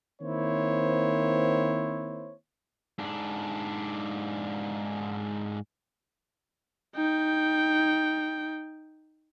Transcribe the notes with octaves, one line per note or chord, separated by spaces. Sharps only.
D#3 A#3 C4 E4 C5 C#5
G#2 D4
D#4 G5